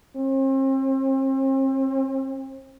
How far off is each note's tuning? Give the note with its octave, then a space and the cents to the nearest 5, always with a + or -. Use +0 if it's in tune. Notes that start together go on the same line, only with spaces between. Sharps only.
C4 +40